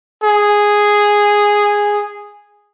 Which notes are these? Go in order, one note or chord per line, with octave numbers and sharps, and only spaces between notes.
G#4